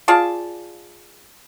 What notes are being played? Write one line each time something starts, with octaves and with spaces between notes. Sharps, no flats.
F4 G#4 D5 A5